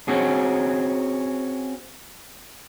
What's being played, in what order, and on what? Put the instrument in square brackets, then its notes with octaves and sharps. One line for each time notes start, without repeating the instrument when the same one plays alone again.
[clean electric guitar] C4 C#4 F#4 G#4